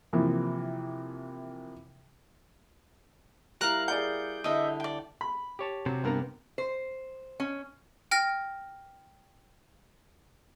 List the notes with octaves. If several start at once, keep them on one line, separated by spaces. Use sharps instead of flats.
C3 E3 F3 A#3
G3 E4 A#4 F5 A#5 F#6
G#4 D5 F#5 G6
D3 D4 E4 D#5 E5
D5 G5
B5
G4 C#5 A5
C3 F#3
G2 A#3 B3 A#4 A#5
C5
C#4
G5 F6 A#6